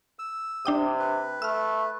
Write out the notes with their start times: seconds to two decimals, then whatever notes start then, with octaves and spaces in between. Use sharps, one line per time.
0.19 E6
0.65 C3 D4 G5 D#6
0.99 B4
1.42 A3 E6 F6